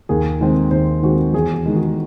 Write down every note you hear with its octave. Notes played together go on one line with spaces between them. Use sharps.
D#2 G#4
D#3 G#3 C4
D#2 C5
D#3 G#3 C4 F#4
E2 G#4
G#4
D#3 G#3
F#4